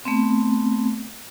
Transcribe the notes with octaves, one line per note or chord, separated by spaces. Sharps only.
A3 B3 C4